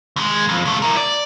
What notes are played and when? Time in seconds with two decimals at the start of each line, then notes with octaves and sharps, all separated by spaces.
0.16 D#2 G#3
0.49 F2
0.65 C#2 A3
0.82 E4 A#4
0.97 D5